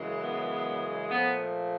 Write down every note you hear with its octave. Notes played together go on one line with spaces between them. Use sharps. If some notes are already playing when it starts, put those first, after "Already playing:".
Already playing: F#2 C#3 E3 G#3
B3
A#2 F3 A3 B3